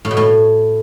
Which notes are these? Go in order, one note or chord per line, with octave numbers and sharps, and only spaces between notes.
A2
B2
A2